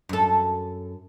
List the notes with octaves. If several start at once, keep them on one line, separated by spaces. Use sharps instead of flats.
F#2 A4